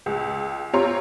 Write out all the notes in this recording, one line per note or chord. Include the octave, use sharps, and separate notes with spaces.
C#2
C4 F4 G4 C#5 A#5 C6